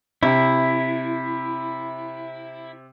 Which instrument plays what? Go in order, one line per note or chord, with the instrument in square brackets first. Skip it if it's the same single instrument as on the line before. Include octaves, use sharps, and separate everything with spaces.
[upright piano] C3 [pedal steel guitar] E4